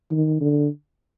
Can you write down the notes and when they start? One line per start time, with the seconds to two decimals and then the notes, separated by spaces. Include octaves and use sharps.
0.12 D#3
0.41 D3